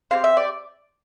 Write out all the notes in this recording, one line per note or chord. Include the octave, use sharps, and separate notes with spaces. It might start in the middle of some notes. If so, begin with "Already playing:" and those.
C4 E4 G4 F5
E5
D5